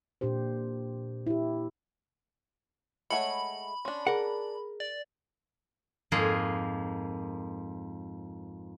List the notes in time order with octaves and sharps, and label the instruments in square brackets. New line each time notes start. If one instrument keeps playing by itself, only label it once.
[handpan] A#2 D4 G4 C5
E4 G4
[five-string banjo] G#3 A3 C#5 [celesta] F#5 C#7 [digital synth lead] B5
[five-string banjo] C#4 D4 [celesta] C6
[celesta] G#4 [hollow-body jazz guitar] A#4 F#5
[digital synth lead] D5
[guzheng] F2 G#2 A#3 G#4